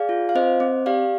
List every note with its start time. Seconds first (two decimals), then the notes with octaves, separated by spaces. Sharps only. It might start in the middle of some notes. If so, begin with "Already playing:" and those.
Already playing: G#4 D5 F5
0.09 F4
0.29 F5
0.35 C4 C5 D#5
0.60 C4
0.86 G4 D5 F5